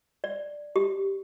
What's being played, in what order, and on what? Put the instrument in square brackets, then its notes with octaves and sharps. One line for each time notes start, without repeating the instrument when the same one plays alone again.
[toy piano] D5
G4